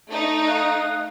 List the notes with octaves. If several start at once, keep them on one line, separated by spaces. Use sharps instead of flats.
A3 D#4
F5 D#6 F#6